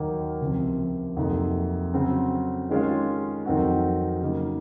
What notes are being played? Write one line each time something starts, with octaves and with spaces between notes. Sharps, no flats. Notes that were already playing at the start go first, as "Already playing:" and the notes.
Already playing: D#2 D#3 F#3 A#3
C#2 C3 F3 C4
F2 C3 F#3 A#3 D#4
C#3 F#3 C4
D#3 G#3 C#4 F4
F2 D#3 F#3 C4 F#4
C#3 F#3 A#3 D#4